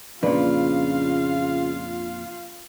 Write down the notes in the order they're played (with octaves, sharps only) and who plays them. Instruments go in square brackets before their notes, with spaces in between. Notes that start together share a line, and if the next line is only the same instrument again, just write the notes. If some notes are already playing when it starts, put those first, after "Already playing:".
[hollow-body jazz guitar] F2 A#2 [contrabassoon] C#3 [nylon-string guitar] D4 B4 [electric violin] F4 F5